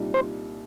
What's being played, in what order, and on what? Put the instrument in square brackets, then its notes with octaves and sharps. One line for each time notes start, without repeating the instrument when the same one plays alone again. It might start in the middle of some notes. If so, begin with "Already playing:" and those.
Already playing: [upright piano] C2 A#2 G3 D#4
[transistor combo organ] C5